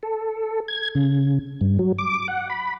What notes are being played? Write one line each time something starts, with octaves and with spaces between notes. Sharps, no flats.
A4
G#6
C#3
G2
F#3
D6
F#5
B5